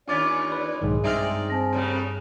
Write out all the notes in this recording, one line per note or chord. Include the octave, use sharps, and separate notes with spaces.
D#2 C#4 D4 F4 D5 D6 A6
B4
B1 G#2 D#3 G#3
G2 C4 D#4 G#4 D5 E5 F6
C4 G#5 A5 A#6
A2 C#3 G3